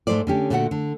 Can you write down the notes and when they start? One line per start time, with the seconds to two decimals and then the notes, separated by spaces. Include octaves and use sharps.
0.07 G#2 B2 A3 C5 D5
0.27 D3 C#4 G4
0.50 A#2 D3 A3 F#4 D5 F#5
0.71 D3